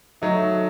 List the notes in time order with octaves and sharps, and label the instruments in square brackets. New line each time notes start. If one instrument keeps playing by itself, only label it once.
[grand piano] F#3 A3 D#4